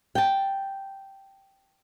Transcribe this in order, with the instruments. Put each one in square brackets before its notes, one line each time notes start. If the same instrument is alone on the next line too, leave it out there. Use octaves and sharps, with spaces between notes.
[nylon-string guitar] G5 A5